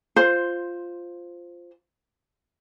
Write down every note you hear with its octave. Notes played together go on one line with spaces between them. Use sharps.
F4 C5